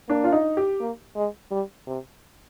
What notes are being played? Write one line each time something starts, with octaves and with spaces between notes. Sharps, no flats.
A#3 D4
F4
D#4
G4
A#3
G#3
G3
C3